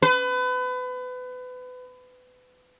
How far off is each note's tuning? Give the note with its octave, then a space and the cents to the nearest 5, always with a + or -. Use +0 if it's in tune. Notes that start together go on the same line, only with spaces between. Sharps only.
B4 +30